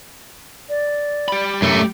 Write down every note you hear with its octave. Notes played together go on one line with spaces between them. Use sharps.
D5
G4 B5
F#2 A3